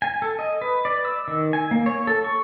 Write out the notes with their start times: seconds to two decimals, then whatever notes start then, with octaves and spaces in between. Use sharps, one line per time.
0.02 G#5
0.22 A4
0.39 D#5
0.62 B4
0.85 D5
1.05 E6
1.28 D#3
1.53 G#5
1.71 A#3
1.86 C#5
2.07 A4
2.24 C#6